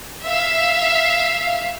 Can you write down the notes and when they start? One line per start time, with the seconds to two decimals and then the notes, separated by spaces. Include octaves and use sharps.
0.23 E5 F5